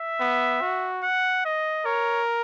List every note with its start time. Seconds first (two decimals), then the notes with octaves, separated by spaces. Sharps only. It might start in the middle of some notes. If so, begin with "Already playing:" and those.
Already playing: E5
0.20 B3
0.61 F#4
1.03 F#5
1.45 D#5
1.86 A#4 C#5